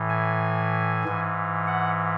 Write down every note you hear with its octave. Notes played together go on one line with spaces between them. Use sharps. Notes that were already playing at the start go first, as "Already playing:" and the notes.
Already playing: A2 E3
G#5
G#2 E3
F#5